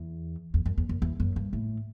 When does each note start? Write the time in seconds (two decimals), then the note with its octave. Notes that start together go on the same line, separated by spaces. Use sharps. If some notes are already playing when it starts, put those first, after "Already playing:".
Already playing: E2
0.54 E2
0.66 F#2
0.78 E2
0.89 F#2
1.02 E2
1.20 F#2
1.36 G2
1.53 A2